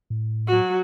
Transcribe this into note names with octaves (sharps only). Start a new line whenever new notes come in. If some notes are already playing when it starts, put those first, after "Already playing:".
A2
F#3 F#4